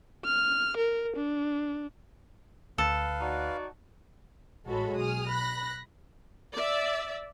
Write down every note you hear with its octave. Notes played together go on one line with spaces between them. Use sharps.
F6
A#4
D4
D2 A4 B4 F5
D#4 F#4 D5
A1 G#3 F#4 A4 C#5 B5
B1 G#4 D#6 F6
B5 F#6 A#6
D5 E5